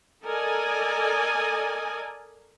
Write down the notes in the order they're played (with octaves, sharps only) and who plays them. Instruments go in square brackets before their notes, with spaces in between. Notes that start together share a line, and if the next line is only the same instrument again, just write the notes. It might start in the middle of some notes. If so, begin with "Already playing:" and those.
[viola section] A4 A#4 D5 D#5 G#5